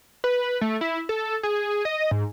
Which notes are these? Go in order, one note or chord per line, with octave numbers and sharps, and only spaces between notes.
B4
A3
E4
A4
G#4
D#5
G#2